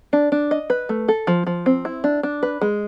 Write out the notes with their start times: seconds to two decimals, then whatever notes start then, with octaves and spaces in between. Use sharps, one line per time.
0.13 D4
0.32 D4
0.51 D#5
0.70 B4
0.89 A3
1.08 A4
1.27 F3
1.47 F3
1.66 C4
1.85 E4
2.04 D4
2.23 D4
2.43 B4
2.61 G#3